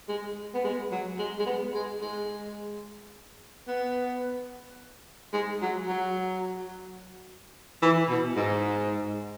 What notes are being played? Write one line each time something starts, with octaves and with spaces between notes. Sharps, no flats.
G#3
B3
G#3
F#3
G#3
G#3
B3
G#3
G#3
B3
G#3
F#3
F#3
E3
B2
G#2